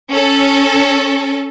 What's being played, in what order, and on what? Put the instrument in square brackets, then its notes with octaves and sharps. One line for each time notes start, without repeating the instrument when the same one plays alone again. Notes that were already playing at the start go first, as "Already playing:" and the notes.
[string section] C#4 A4